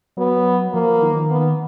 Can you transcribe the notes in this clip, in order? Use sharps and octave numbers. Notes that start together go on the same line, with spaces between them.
F#3 B3
F3 A#3
D#3
B3